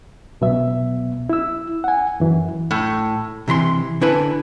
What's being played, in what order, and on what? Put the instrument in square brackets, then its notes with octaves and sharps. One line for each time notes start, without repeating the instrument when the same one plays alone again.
[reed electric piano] C2 B2 F#3 B3 E5
E4 E6
F#5 G#5
F#2 E3 F#3
[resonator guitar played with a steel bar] A2
[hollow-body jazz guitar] C3 E3 B5 C6
D3 E4 A4 B4 G#5